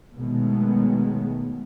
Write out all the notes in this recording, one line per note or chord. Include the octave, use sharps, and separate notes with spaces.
B2 D#3 F#3 G#3 A3 B3